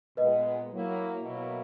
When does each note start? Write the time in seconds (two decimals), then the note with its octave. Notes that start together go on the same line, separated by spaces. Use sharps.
0.17 A#2 G#3 B3 B4 D#5
0.71 F#3 A#3 E4
1.23 B2 F#3 A#3 E4